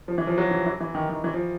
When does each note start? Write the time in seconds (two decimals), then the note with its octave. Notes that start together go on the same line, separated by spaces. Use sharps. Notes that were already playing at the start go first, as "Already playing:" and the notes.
0.08 F3
0.18 E3
0.27 F3
0.38 F#3
0.51 E3
0.66 E3
0.80 E3
0.95 D#3
1.10 D#3
1.24 E3
1.34 F3